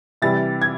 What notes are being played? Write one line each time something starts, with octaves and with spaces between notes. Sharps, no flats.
C3 E3 G3 A6
G#6